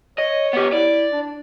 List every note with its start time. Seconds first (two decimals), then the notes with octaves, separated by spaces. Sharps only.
0.18 C#5 D#5
0.53 B3 G4
0.73 E4 D5
1.12 D4